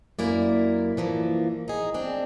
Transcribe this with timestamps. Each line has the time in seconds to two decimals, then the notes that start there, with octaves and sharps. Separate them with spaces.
0.19 F#2 A#3 E4 D5
0.97 E3 F3 A#3
1.68 D#4 G#4
1.94 C4 D4